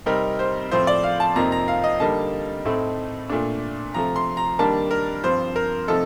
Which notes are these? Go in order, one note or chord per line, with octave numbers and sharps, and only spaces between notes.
C3 G3 C4 D#4 A#4
C5
A2 F3 C4 C5
D5
F5
A5
F2 C3 F3 A#3 D#4 A#5
A#5
F5
D#5
D3 G3 A#3 D#4 A5
A2 A3 C4 D#4
A#2 A3 D4
C3 F3 A3 A#5
C6
A#5
D#3 G3 A#3 D4 A5
A#4
G2 F3 C4 C5
A#4
C3 F3 A3 D#4 A4